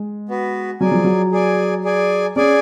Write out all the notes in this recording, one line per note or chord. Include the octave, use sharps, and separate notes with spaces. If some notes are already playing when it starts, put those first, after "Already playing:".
Already playing: G#3
B3 F#4 B4
F#3 G#4 D5 G#5
F3
F#3
G#4 D5 G#5
G#4 D5 G#5
C#4 G#4 D5 G#5